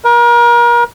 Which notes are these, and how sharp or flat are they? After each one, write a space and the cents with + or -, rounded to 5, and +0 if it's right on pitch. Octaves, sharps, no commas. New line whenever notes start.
A#4 +35